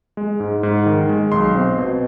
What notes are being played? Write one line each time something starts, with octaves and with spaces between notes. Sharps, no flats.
G#3
G#2
G#2
D#3
G#3
B1 C6
C4
B2